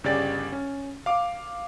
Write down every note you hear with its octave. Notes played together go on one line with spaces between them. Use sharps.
G1 C#3 G4 D5 A6
C#4
F5 D6